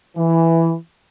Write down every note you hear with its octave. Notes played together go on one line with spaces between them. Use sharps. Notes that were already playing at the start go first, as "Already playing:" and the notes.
E3